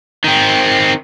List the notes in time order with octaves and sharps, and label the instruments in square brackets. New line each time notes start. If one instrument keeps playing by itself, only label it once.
[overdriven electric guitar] D#3 C4